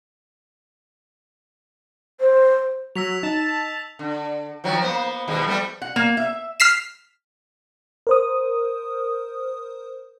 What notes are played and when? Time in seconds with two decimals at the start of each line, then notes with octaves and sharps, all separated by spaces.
2.20 C5
2.95 F#3 E6 B6 F7
3.23 D#4 A5
3.99 D3
4.64 D#3 F3 F#3
4.82 A#3 B3 C5
5.28 D#2 B2 G#3
5.47 G3 A3 B3
5.82 F#5
5.96 A#3
6.17 E5
6.60 F6 B6 C7 E7
8.07 A#4 C5 D#6